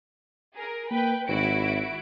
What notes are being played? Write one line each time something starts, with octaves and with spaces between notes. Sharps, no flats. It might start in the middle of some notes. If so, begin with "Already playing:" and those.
G#4 A#4
A#3 B4 G5
G#1 E4 F#4 D7